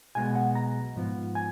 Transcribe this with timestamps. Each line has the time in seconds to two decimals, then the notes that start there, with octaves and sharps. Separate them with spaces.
0.15 B1 B2 G#3 B3 G#5
0.35 F#5
0.55 A#5
0.96 G#2 F3 B3
1.35 G#5